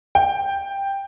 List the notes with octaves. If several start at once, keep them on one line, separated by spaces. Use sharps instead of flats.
G5